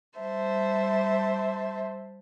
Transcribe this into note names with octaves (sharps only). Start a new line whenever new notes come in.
G3 C5 E5 A5